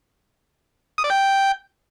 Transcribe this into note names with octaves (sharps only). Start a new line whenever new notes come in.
D#6
D5
G5